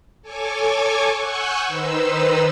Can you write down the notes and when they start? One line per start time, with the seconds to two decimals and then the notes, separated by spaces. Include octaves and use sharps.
0.22 A4 C#5 G#5 C#6 D6
1.15 F#5 G#5 C#6 E6 F#6 G6
1.66 D#3 D#4 B4 C5 E6